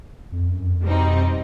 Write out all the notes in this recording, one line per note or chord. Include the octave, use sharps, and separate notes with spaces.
F2
F#2
F2
B2 G3 C4 D#4